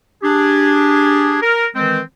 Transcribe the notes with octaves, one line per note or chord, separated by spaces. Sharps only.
D4 G4 G#4
A#4
D#3 E3 G#3 C4